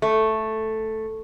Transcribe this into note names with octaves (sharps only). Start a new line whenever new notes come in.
A3